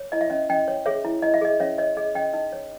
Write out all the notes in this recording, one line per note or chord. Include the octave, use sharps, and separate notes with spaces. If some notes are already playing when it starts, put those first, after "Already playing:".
Already playing: C#5
E4 D#5
E5
C#4 D#5
C#4 D#5 G5
C#5
G#4 C#5 E5
E4
E4 D#5
E5
G#4 D#5
C#4 C#5 E5
C#5 D#5
G#4 D#5
C#4 D#5 G5
D#4 D#5
C#5